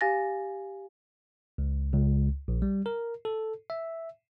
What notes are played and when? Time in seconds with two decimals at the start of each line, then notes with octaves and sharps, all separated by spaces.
0.01 G4 F5 G#5 A6 A#6
1.58 C#2
1.93 C#2
2.48 A#1
2.62 G3
2.86 A#4
3.25 A4
3.70 E5